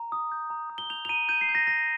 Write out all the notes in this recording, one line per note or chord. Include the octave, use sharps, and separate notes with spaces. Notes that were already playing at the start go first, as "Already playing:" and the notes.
Already playing: A#5
D#6
G6
A#5
D#6
G7
G6 F7
F7
A#5 D#7
G6 D#7
C7
G6
A#6
G6 A#6